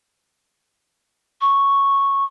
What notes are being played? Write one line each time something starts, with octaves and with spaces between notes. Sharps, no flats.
C#6